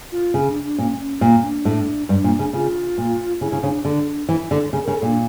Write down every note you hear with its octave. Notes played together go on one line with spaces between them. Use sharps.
F4
C#3
D4
D4
A#2 C#4
C#4
A#2 A#3
D4
A2
G2 D4
A#2
C#3
C#3 F4
A#2
C#3 E4
C#3
C#3 D4
D3 D4
E3 E4
D3
C#3
C#3 A#4
A4
A#2 D4